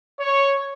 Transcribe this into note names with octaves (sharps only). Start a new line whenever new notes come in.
C#5